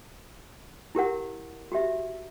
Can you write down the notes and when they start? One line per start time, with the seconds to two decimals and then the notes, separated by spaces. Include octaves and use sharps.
0.95 E4 G4 A#4 F#5
1.72 F#4 G4 E5